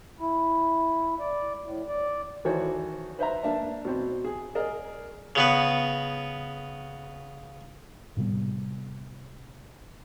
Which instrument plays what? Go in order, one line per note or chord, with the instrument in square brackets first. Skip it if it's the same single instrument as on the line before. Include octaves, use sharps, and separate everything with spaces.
[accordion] E4
D5
A2
D5
[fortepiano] D#3 E3 F#4 A4 C5 C#5
B4 C5 E5 A#5
A#3 D4 E5 A5
B2 C4
G#4
G#4 A#4 D5 D#5
[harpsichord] C#3 B3 B4
[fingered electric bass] A2 C3 G3 B3